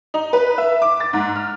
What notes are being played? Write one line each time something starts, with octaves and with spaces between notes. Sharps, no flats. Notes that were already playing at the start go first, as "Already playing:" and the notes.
D#4
B4
E5
D6
A6
G#2
F6